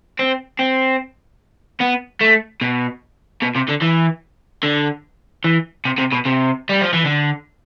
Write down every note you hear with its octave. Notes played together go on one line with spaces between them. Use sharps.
C4
C4
B3
A3
B2
B2
C3
D3
E3
D3
E3
C3
C3
B2
C3
G3
F3
E3
D3